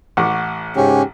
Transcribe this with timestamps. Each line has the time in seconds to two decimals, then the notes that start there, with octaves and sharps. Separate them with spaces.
0.17 A1 F#5 C#6 D6
0.76 G#2 C#3 C#4 G4